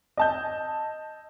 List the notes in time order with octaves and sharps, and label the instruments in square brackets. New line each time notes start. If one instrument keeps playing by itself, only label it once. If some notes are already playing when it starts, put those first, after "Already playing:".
[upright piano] D#5 A5 G6